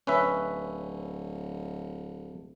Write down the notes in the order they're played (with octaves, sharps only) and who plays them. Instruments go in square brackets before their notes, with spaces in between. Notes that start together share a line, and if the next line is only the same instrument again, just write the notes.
[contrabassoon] D1 [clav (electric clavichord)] C#4 B4 E5